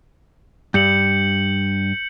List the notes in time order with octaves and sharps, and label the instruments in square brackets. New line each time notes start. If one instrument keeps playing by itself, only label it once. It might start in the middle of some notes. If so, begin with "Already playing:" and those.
[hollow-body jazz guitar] G2 [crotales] G6 C#7 F#7